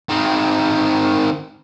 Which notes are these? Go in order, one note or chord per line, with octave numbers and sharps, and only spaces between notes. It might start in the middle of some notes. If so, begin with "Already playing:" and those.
D#3 C4